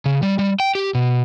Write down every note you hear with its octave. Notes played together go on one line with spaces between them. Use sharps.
C#3
G3
G3
G5
G4
B2